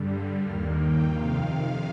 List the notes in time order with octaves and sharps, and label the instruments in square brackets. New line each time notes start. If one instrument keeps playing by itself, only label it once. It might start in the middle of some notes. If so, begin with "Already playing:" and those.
Already playing: [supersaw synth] G2 D3 G3
D#2 D#3 A#3 F6
G5
F2 C3 D#3 F5